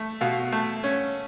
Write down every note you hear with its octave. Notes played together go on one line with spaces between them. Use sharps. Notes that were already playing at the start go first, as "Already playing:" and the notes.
Already playing: A3
B2 F5
A3
C#4